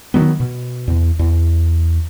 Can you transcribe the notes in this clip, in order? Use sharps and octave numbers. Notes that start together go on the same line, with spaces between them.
D#3 F#3 B3
B2
E2
E2